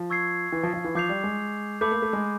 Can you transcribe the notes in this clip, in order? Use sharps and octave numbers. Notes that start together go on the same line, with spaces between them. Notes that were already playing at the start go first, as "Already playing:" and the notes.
Already playing: F3
C#6 E6 G#6 C7
E3
F3
F3
E3
F3 D6 G6 C7 F7
G3
G#3
A3 B5 D6 G6
A#3
A3
G#3